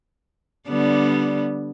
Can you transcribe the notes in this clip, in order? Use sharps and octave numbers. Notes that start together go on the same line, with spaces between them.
D3 G3 B3